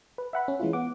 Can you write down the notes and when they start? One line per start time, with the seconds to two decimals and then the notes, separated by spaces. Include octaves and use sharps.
0.18 B4
0.33 E5 F#5 B5
0.48 C#4
0.60 E3 G#3 C#4 E4 F4
0.73 B3 F#5 D6